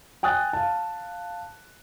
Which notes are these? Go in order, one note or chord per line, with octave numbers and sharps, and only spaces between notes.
G5 G#5 D#6 F#6 A6
F5 A5